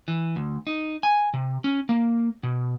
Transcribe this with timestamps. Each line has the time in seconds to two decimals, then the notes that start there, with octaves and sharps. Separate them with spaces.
0.08 E3
0.36 D2
0.67 D#4
1.03 G#5
1.34 C3
1.64 C#4
1.89 A#3
2.43 B2